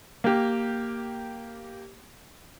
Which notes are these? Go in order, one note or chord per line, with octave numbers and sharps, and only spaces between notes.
A#3 G4